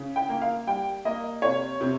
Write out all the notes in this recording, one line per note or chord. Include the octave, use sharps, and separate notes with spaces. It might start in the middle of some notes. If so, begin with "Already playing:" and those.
Already playing: C#3
G5
A#3
F5
G3 G5
A#3 D#5
C3 C#5
C3